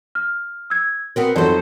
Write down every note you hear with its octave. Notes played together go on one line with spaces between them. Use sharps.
F6
E6 G#6
B3 C4 F#4 A#4
F2 F#3 D#4 A4 C5